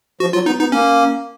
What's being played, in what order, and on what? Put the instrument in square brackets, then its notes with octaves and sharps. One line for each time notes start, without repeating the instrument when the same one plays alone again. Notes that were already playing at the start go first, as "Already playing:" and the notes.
[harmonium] F3 [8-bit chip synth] F#4
[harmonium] F#3 [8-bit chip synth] F4
[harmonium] B3 [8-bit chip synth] D#4
[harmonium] B3 [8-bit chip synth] D#4
[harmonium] A#3 [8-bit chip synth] C#4